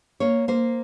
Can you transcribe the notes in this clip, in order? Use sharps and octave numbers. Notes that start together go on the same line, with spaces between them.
A#3 C#5
A#3 C5